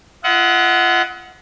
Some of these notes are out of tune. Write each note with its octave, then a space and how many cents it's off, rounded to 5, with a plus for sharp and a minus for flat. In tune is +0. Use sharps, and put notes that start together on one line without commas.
F4 -35 D#5 +40 F#5 +0